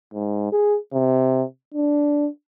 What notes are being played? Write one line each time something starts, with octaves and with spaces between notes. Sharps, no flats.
G#2
G#4
C3
D4